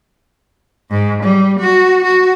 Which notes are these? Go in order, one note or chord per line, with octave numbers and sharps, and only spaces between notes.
G#2
G3
F#4
F#4